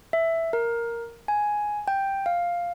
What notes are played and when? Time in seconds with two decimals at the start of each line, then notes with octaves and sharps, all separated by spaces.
0.13 E5
0.53 A#4
1.28 G#5
1.88 G5
2.26 F5